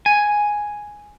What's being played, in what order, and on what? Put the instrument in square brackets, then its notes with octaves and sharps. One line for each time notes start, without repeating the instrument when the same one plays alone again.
[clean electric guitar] G#5